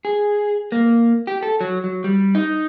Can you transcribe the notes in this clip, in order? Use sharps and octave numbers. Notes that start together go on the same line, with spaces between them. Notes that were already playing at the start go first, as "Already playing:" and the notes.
G#4
A#3
G4
A4
F#3
F#3
G3
D#4